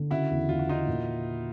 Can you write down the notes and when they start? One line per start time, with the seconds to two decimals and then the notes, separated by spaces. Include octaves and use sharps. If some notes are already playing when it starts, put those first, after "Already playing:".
Already playing: D3
0.11 C#3 E4 F#4
0.30 E2
0.49 E2 F4
0.59 F#4
0.68 E3 D#4 F4
0.87 A#2